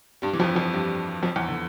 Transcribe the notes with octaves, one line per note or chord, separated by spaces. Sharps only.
G2 G3
E3
F2 F3
F2 F3
G2 G3
F2 F3
E2 E3
D3